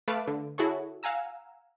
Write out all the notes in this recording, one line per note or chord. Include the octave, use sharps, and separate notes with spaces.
A3 B4 F5 A5 D6
D3
E4 F#4 G#4 A4 C#5
F5 F#5 G#5 A#5 E6